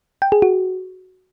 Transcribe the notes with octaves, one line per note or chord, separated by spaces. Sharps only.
G5
G#4
F#4